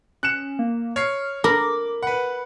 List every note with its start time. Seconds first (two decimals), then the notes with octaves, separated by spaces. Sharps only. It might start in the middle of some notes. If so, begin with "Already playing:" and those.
0.23 C#4 F#6 C#7 E7
0.59 A#3
0.96 C#5 F6 C7
1.44 A#4 B5 D6
2.03 B4 F#5 B5